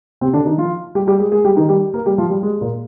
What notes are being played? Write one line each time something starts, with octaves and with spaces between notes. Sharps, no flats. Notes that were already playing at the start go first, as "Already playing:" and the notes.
C3 C4
D3 D4
D#3 D#4
F3 F4
G3 G4
G3 G4
G#3 G#4
G#3 G#4
G3 G4
D#3 D#4
G3 G4
A#3 A#4
G3 G4
F3 F4
G3
G#3
A#2 A#3